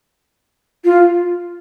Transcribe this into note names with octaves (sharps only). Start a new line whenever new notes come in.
F4